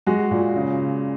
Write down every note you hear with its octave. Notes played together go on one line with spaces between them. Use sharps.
G#3 F#4
A#2
C#3